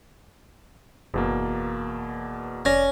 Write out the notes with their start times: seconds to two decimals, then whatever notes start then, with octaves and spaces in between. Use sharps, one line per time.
1.14 F#1 E2 B2 A#3
2.65 F1 C#4 D5 G#6 A#6